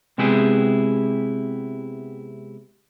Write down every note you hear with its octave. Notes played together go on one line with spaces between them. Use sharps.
C3 G#3 B3 E4 G4 G#4